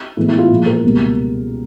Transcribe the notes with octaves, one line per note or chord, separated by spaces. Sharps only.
A2 E3 G#3 B3 E4
E4
F4
A#2 F3 G#3
A#4
C#2 B2 G3 A#3